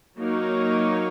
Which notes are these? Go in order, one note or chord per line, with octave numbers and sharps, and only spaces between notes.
F#3 A#3 D#4 A#4 C#5